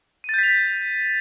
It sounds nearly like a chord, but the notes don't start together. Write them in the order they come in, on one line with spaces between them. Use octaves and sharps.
D#7 A6 G6 B6 F7